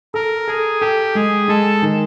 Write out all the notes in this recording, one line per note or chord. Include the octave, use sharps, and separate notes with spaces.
A4 A#4
G#4 A4
G4 A4
G#3 G#4
G#3 A4
D#3